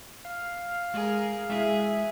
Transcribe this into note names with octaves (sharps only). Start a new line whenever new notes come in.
F5
G#3 G#4 A#4
G#3 E4 F#4 G#4 E5